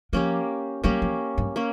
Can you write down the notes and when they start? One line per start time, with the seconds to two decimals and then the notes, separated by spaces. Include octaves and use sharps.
0.13 F3 A#3 C#4 G4
0.84 G3 A#3 C#4 G4
1.02 F3
1.38 G2
1.56 A#3 C#4